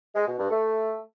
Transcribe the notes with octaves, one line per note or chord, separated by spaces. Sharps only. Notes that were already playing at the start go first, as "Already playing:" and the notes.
G#3
B2
G2
A3